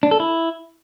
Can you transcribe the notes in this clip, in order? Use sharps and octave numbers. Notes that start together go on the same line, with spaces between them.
D4
A4
E4